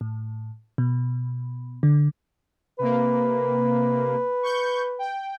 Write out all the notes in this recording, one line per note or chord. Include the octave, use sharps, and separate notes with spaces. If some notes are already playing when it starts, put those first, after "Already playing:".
A2
B2
D3
C3 A#3 B4
C#6 G6
G5